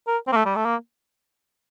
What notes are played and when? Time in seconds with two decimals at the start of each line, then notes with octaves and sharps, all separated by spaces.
0.07 A#4
0.27 C4
0.32 A#3
0.36 A3
0.45 G3
0.55 A3
0.65 A#3